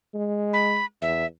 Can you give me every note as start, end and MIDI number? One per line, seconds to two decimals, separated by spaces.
0.15 0.82 56
0.53 0.85 83
1.02 1.24 40
1.02 1.26 76